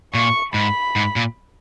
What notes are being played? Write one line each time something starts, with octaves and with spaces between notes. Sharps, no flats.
A#2 C#6
G#2 B5
G#2
A#2